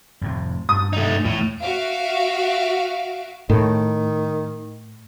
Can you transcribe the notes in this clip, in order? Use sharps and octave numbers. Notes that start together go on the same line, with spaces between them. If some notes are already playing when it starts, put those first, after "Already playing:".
F2 A2 C3
G2 D#6
A3 D#4
E2 A2
F#4 E5 F5 D7
A2 D#3